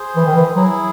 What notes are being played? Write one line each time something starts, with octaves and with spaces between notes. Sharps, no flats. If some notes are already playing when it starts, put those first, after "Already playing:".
Already playing: G#4 C5
E3
D#3
E3
F#3 E4 G#4